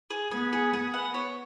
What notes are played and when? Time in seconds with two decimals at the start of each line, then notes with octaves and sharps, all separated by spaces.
0.10 G#4
0.31 B3 G#4
0.53 G#4
0.73 G#4
0.94 B3 F#5
1.14 C#5